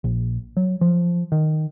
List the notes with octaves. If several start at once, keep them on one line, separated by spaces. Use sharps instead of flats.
A#1
F#3
F3
D#3